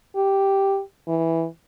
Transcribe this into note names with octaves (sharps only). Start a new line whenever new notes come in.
G4
E3